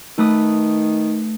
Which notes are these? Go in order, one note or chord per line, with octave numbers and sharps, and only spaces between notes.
D#3 A3 B4 D#6